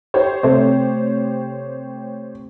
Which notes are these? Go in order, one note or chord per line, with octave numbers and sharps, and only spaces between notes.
G4 C5 C#5
C3 A3 C4